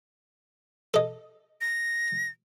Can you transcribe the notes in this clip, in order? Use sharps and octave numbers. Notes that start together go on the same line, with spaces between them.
A4 D#5
A#6